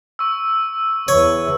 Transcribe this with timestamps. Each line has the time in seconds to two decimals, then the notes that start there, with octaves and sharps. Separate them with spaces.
0.19 C#6 E6
1.08 E2 E3 C#5